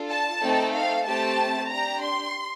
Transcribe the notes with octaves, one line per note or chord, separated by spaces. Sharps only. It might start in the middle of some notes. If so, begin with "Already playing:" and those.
Already playing: D4 F4 A4
A5
A3 C4 D#4 A4
F5
A3 C4 G4 A5
D4 G4 A#5
C6